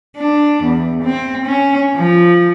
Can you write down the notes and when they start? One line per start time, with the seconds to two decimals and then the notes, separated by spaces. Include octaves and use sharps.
0.18 D4
0.64 E2
1.03 C4
1.46 C#4
1.96 F3